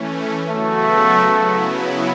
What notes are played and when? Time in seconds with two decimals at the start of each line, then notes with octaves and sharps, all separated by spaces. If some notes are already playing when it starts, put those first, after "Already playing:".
Already playing: E3 A3 C#4
0.48 C#3 F#3 A3 B3 F#4
1.37 C#3 F#3 B3 E4